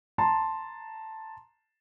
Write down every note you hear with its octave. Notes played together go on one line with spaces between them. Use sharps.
A5 A#5 C6